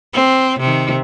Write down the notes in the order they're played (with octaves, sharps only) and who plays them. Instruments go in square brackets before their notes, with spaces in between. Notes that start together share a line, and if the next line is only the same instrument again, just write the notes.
[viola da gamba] C4
C3 D#3